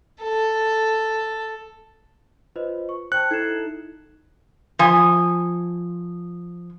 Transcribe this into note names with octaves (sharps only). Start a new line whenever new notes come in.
A4
F4 B4 C5 D#5
C#6
C5 G5 A5 F#6 C#7
D#4 E4 A4 G#6 C7 E7
F3 G#5